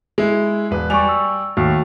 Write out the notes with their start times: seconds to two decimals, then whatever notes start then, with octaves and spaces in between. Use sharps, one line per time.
0.18 G#3 E4
0.71 E1 B4
0.90 G3 D5 G#5 C#6 F7
1.09 E6
1.57 D#2 A3 F#4